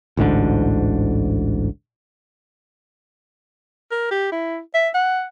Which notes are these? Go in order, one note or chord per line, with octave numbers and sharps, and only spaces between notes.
A1 D2 G#2 D3
A#4
G4
E4
E5
F#5